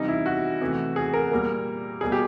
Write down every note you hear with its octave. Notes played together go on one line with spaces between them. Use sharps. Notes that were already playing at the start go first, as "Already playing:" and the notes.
Already playing: C3 E3 G3 D#4
E4
F#4
C3 E3 A3
G#4
A#4
A#2 G3 A#3
B2 G3 A#3 G#4
G4